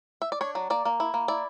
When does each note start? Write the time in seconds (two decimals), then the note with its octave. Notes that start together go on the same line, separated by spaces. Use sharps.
0.22 E5
0.32 D5
0.41 D4 C#5
0.55 F#3
0.70 A#3 D5
0.85 A#3
1.00 E4
1.14 A#3
1.28 E4 D5